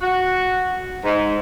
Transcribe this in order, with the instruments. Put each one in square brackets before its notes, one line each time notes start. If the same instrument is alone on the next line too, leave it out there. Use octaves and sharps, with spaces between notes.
[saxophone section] F#4
G#2